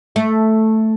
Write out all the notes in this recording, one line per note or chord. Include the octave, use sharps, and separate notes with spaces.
A3